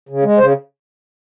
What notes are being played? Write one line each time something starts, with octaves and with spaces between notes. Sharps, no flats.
C#3
G#3
C#3 C5